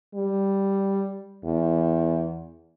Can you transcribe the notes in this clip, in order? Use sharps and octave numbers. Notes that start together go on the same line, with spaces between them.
G3
E2